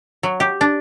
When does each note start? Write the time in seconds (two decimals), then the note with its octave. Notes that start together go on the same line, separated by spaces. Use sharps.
0.23 F#3
0.40 G4
0.61 D4